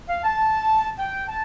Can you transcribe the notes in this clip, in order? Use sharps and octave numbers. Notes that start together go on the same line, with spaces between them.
F5
A5
G5
A5